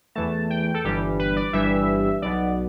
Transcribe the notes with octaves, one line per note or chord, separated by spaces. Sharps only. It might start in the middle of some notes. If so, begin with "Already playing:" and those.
E2 E3 A3 A5
G5
A4
G1 G2 E3 G3 G4
B4
D5
G1 G2 E3 G3 E5
B1 B2 B3 D5